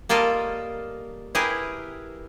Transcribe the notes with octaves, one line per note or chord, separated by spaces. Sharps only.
G3 A#3 F4 A4 A#4 D#5
E4 G4 G#4 A#4 B4